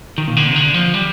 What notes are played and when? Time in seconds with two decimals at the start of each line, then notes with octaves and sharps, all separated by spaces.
0.18 D#3
0.28 A#2
0.37 D3
0.47 C3
0.56 D3
0.74 F3
0.94 G3